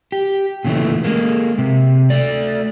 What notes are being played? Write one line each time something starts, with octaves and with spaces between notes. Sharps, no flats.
G4
A#2 C#3 E3 A3
G#3 A#3
C3
A3 D5